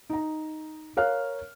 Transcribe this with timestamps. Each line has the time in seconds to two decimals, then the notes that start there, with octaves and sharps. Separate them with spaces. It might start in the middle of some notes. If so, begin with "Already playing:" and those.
0.10 D#4 A#5
0.97 A#4 C#5 F5 F6 F#6